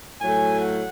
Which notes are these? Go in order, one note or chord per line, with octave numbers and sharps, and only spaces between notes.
A2 F#3 A3 G#5
F#5